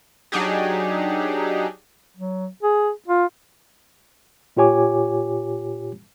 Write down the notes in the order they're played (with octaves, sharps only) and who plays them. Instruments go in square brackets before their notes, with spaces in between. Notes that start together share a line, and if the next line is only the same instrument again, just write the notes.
[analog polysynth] F#3 D4 D#4 G4 G#4
[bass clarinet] F#3
G#4
F4
[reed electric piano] A#2 F4 G4 C#5 G#5 D6